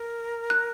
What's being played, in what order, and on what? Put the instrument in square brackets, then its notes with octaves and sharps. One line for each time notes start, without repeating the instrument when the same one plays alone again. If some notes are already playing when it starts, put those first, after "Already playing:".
Already playing: [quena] A#4
[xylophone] F#6